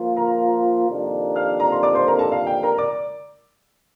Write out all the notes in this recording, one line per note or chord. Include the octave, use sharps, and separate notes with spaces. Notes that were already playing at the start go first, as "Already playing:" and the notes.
Already playing: F3 A#3 F4
A#4 A#5
F2 C3 D#3 A#3 D4
F5 F6
A#5
C6
D5 D6
C5 C6
A#4 A#5
A4 A5
F5
G5
A#4 A#5
D5 D6